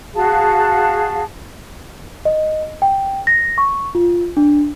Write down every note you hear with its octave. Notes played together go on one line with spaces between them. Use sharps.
F#4 G#4 F5 A5
D#5
G5
A#6
C#6
F4
D4